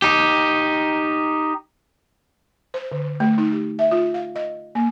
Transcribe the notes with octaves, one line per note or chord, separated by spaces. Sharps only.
D#4 G4
C5
D3
A3
D#4
G4
E5
F4
F5
D#5
A#3